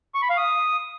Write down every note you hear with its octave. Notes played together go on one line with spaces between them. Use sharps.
C#6
B5
F5
D#6